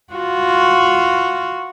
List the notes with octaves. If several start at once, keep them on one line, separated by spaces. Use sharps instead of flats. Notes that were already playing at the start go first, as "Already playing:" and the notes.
F4 F#4